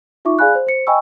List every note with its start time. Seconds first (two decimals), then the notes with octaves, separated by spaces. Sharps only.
0.25 D#4 F4 E5 C#6 D6
0.39 G#4 D5 F5 G#5 B5 F#6
0.55 C5
0.67 C5 C#7
0.87 D#5 G5 G#5 B5 C#6 E6